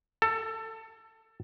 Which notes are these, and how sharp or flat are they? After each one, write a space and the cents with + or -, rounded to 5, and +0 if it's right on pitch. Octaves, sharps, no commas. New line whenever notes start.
A4 +20